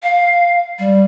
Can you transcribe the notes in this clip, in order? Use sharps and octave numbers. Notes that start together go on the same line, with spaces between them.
F5
G3